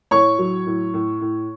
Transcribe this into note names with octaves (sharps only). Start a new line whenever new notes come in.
A2 C#5 C#6
F#3
A2
A2
A2